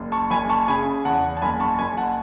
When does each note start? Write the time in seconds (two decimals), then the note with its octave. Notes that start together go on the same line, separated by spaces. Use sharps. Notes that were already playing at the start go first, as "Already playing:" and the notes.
Already playing: F#1
0.12 A5 C#6
0.30 F#1 G#5 B5
0.49 A5 C#6
0.68 C#3 G#5 B5
1.05 E2 F#5 A5
1.37 A5
1.42 F#1 G#5 B5
1.60 A5 C#6
1.79 F#1 G#5 B5
1.97 F#5 A5